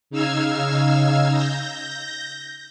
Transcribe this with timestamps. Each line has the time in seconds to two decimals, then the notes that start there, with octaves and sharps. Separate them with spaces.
0.10 C#3 D#4 F5 E6 F6 G#6
1.30 G6 A#6